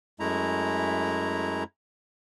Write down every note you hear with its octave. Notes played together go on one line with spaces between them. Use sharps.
F#2 G#3 A3 E4 A#5